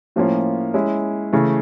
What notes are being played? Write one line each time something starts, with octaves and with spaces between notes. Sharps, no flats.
A2 F3 A#3 C#4 F4
G#3 C#4 E4
C#3 E3 A3